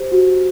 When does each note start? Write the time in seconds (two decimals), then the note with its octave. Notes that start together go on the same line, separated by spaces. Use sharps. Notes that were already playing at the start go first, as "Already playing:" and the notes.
Already playing: G4 C5
0.12 F#4